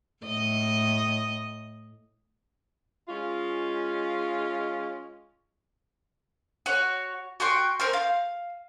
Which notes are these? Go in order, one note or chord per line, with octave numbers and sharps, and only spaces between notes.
A2 D#5
G#3 C#4 F4
F#4 C#5
F#4 G5 C6 C#6
A#4 C5 F6
F5